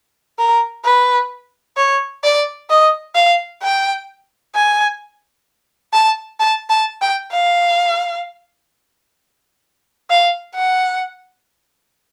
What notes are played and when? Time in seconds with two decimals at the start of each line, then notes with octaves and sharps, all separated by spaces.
0.39 A#4
0.84 B4
1.77 C#5
2.24 D5
2.70 D#5
3.15 F5
3.63 G5
4.55 G#5
5.93 A5
6.40 A5
6.70 A5
7.02 G5
7.32 F5
10.10 F5
10.55 F#5